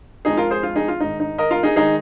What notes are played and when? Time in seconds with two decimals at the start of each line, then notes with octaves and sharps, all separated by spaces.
0.25 F2 F3 G#3 D#4 G#4
0.37 F4 A#4
0.50 G#4 C5
0.63 F4
0.76 D#4 G#4
0.88 F4
1.00 G#2 D#3 G#3 D#4
1.20 D#4
1.38 A#4 D#5
1.51 F4 A#4
1.63 D#4 G#4
1.76 D#3 G#3 D#4 G#4